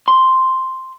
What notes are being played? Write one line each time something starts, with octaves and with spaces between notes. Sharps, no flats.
C6